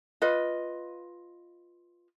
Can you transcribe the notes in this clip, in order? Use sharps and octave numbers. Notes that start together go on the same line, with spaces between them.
F4 B4 D#5